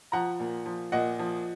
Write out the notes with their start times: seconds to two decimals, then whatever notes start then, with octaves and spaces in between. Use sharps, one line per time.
0.12 F3 F#5 A#5
0.40 A#2
0.66 F3
0.92 A#2 D#5 F#5
1.19 F3